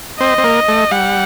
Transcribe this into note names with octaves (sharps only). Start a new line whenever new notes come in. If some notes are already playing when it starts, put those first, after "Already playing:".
C4 D#5
C4
A#3
A3
G3 F#5